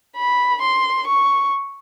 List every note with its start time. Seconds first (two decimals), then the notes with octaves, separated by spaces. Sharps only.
0.17 B5
0.61 C6
1.07 C#6